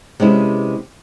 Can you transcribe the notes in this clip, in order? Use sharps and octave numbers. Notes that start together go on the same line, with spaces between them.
C3 G#3 B3 C#4 E4